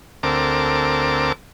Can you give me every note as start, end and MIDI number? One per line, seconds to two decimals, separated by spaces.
0.23 1.32 38
0.23 1.32 60
0.23 1.32 69
0.23 1.32 70
0.23 1.32 86